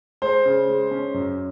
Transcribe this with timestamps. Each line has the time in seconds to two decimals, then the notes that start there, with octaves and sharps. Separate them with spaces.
0.22 G#3 C5
0.46 C#3
0.68 G#3
0.91 C#4
1.14 F#2